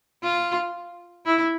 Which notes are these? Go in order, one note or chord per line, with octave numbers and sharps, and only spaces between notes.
F4
E4